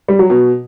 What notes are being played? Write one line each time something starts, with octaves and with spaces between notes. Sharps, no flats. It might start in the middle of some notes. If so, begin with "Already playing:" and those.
G3
F#3
B2